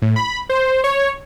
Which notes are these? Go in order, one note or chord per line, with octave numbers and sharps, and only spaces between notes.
A2
B5
C5
C#5